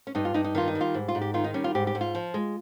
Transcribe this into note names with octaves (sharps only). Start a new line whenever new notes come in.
C#4
G2 D#4
F4
G2 D#4
D#4
D#3 F4
D#4
G3
F4
G#2
F4
G#2
G4
D#3 F4
D#4
G3 C#4
F4
G#2 G4
G4
G#2
F4
F3
G#3